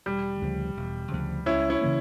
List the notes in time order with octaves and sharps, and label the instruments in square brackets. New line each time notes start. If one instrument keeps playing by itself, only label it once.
[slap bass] E1 [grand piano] G3
[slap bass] D2 C#3 F3
E1
D2 C#3 F3
[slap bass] C#2 [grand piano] C#4 E4
[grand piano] C#4 E4
[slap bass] C#3 E3 A#3